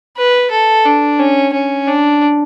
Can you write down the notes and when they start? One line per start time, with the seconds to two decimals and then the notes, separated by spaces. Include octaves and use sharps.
0.17 B4
0.51 A4
0.86 D4
1.19 C#4
1.53 C#4
1.87 D4